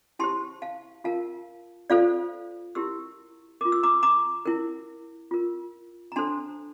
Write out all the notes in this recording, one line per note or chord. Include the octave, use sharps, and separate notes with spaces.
E4 G4 C5 A5 C6
F5 A5
F4 A#4 F5 A5
F4 A4 C5 D5 F5
E4 G4 A#4 C6 E6
F4 A#4 D6
E6
A#5 D6
A#5 D6
E4 A#4
F4 A#4
A#5
D4 A4 C5 A5 C6